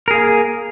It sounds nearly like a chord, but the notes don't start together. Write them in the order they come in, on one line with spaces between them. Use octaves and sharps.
A#4 G#4 A#3